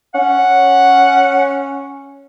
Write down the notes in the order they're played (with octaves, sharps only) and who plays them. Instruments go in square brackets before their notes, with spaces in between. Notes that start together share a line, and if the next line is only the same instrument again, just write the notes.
[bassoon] C#4 [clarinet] F#5